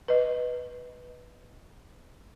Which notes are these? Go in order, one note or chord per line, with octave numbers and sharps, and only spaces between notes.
B4 D#5